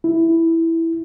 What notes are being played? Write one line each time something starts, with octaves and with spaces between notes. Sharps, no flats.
E4